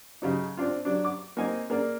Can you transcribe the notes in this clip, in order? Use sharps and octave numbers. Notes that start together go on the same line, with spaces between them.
C#3 F#3 D#4
C4 D4 F4
F#3 D4
D6
A#3 C4 D#4 G#5
A#3 G#4 A#4 D5